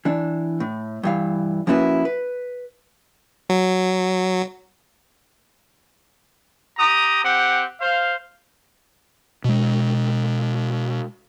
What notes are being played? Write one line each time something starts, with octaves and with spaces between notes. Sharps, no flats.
E3 D4
A2
G2 E3 F5
F3 A#3 C#4 E4 F#4 B4
B4
F#3
G4 A#5 D#6
C4 G4 F#5
C5 F5
B2 G#3